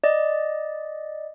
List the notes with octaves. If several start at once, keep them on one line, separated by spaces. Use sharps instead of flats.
D5 D#5